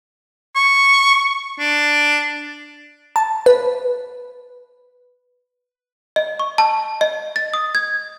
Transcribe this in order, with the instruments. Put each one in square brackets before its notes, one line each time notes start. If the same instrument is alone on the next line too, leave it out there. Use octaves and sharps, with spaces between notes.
[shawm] C#6
D4
[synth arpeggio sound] A5
B4
[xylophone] D#5
C#6
A5
D#5
A6
D#6
G#6